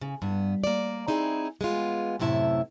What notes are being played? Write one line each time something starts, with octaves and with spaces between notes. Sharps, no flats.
C#3
G2 B3
A#3 D5
C4 D#4 E4 G#4
G#3 B3 F4
F#2 A2 C3 E4 E5 A5